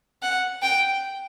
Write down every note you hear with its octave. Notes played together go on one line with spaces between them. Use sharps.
F#5
G5